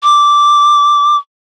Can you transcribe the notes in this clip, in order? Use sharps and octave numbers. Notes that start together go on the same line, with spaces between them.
D6